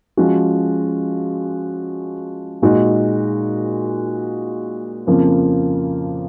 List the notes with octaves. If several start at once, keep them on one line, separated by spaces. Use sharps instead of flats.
F3 G#3 C#4 F#4
A#2 G#3 D#4 F#4
F2 C#3 F3 A#3